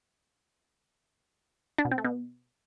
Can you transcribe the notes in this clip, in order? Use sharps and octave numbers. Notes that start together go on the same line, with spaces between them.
D4
B2
C4
A3
B2